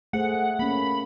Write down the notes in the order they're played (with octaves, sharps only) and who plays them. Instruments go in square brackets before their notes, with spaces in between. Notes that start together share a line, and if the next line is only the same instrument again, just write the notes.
[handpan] A3 G#4 C5 [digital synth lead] F#5
[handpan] A#3 C#4 [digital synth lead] B5